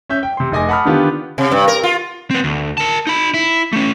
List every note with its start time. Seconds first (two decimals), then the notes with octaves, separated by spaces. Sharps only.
0.09 C#4 E5 G6
0.23 G5
0.37 C3 C6
0.52 F1 G#4 D#5 G#5 D6 A#6
0.69 F#5 A5 B5 D#6 F6
0.85 D3 D#3 B3 F4 G4
1.38 C3
1.52 G2
1.68 A#4
1.83 F4
2.31 C4 B4
2.44 D2
2.78 A#4 A5
3.07 D#4 B5
3.34 E4
3.73 A3 C#4